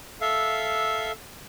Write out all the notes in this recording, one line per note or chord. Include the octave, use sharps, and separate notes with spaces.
A4 E5 F5